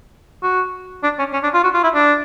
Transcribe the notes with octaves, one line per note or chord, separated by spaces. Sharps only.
F#4
D4
C#4
C#4
D4
F4
F#4
F4
E4
D4